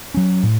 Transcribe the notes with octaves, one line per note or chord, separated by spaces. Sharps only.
F#3 C#4
A2